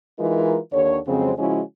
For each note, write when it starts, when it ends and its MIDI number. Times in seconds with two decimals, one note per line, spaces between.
0.19 0.58 52
0.19 0.58 56
0.19 0.58 63
0.19 0.58 65
0.19 0.58 70
0.72 0.98 39
0.72 0.98 50
0.72 0.98 73
1.08 1.32 41
1.08 1.32 49
1.08 1.32 54
1.08 1.32 56
1.08 1.32 60
1.38 1.61 49
1.38 1.61 53
1.38 1.61 56
1.38 1.61 61
1.38 1.61 64
1.38 1.61 66